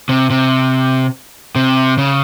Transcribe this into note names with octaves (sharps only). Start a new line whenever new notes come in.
C3
C3
C3
C#3